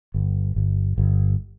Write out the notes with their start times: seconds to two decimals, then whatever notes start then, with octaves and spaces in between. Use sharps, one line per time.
0.14 G1
0.56 G1
0.98 G1